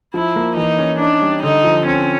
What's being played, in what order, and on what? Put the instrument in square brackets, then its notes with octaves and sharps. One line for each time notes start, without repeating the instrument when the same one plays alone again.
[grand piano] F3 [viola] E4
[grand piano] A#3
[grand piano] E3 [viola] D#4
[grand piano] C#4
[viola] D4 [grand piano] D#4
[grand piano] G3
[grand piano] D3 [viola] D#4
[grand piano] F3
[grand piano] C4 [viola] C#4